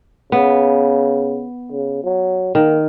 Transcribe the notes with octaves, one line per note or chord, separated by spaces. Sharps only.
C#3 B3
C#3
F#3
D#3 A#3